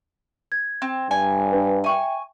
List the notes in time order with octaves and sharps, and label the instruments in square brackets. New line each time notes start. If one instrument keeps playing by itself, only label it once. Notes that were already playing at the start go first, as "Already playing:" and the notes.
[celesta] G#6
[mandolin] C4
[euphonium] G2 [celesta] D5 [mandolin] G#5
[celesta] D4 B4
[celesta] E5 G5 [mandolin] G#5 C#6